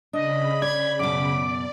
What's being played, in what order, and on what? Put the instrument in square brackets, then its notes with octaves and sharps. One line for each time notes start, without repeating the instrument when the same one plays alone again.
[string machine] C#3 B5 [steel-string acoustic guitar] D4 [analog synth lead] D#5
[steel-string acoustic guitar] D5 [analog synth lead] G#6
[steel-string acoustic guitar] F#2 B2 [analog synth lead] D6
[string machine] D5